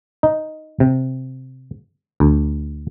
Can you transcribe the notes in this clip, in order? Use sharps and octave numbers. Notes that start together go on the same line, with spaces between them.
D#4
C3
D2